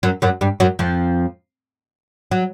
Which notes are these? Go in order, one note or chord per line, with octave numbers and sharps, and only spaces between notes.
F#2 F#3
F#2 F#3
G2 G3
F#2 F#3
F2 F3
F#3